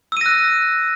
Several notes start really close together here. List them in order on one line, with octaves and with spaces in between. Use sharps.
E6 D#7 A#6 F#6